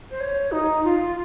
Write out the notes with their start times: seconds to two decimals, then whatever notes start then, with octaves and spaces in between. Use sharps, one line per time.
0.11 C5
0.20 C#5
0.51 D#4
0.84 F4